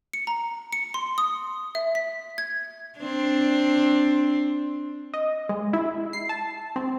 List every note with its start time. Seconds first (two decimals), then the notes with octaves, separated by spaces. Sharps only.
0.13 C#7
0.27 A#5
0.72 C#7
0.94 C6
1.18 D#6
1.75 E5
1.95 B6
2.38 G#6
2.98 C4 D4
5.14 D#5
5.49 G#3
5.73 E4
6.13 C7
6.29 A5
6.76 C4